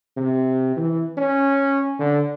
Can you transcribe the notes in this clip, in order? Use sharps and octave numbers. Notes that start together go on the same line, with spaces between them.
C3
E3
C#4
D3